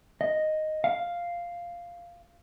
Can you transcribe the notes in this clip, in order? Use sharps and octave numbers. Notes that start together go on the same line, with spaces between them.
D#5
F5